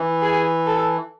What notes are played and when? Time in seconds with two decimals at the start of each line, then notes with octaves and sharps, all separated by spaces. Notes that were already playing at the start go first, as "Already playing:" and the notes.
Already playing: E3
0.22 G#4
0.66 A4